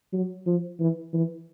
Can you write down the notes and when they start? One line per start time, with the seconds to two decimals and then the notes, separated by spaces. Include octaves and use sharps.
0.13 F#3
0.46 F3
0.79 E3
1.13 E3